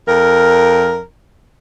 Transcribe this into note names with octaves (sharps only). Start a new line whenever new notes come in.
F2 A#4